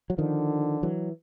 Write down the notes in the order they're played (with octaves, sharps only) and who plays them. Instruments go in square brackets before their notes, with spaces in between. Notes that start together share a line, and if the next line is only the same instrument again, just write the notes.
[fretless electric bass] F#3
[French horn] D3 [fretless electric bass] D#3 F3
[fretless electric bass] E3 F#3